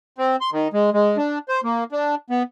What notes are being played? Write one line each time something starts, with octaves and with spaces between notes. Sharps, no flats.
C4
C6
D#3
G#3
G#3
D4
C5
A#3
D4
B3